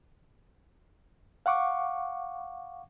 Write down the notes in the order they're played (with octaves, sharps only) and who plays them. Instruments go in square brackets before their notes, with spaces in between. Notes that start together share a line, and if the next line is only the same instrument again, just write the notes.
[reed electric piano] F5 F#5 C#6 D6